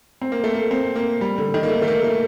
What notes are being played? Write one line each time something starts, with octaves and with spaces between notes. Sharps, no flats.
C4
A#3
A3
A#3
C4
A#3
G3
D3
D#3
A#3
A3
A3
A#3
A3